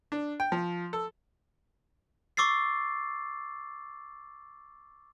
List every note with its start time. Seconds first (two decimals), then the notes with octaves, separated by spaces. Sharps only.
0.12 D4
0.40 G5
0.52 F3
0.93 A4
2.37 C#6 D6 E6 A6 C7